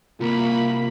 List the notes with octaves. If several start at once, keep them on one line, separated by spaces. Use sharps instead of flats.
C2 A#3 F4 B5